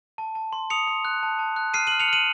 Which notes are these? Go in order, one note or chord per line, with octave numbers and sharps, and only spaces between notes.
A5
A5
C6
D#6 C#7 F7
C6
F#6
A5
A5
F#6
F6 C7 D#7
D#7 F#7
F6
C#7 F7
F6 D#7 F#7